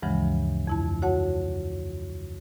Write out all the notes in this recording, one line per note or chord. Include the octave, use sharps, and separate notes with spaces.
D2 G2 C#3 E3 F3 G#3
F2 E4 A5
F#4 C#5 F#5 A5